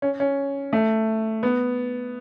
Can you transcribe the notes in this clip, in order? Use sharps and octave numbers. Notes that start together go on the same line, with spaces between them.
C#4
C#4
A3
B3